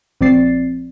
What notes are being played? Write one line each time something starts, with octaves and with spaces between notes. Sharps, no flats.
A#1 F3 C4 D5 A6 C7